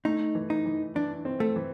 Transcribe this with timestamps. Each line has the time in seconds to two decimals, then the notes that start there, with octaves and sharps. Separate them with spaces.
0.05 A3 D#4
0.35 E3
0.50 D#4
0.66 E3
0.95 E3 D4
1.25 C4
1.40 A3
1.56 E3